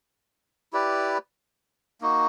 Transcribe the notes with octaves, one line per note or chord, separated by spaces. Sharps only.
E4 G4 B4 D5
A#3 D#4 F#4